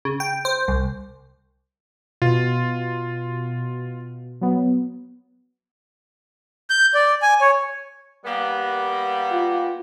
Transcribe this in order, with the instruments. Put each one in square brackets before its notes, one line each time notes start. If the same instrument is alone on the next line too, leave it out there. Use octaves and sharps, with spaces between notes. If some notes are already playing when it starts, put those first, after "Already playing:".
[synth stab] C#3
G5
C5
C2
[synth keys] B2 [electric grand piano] F4
[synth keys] F#3 B3
[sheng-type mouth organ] G6
D5
G#5
C#5
[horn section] G3 A#3 B3
[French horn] F4